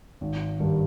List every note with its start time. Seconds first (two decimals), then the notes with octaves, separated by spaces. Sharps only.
0.21 G#1
0.59 G2 D#3 G3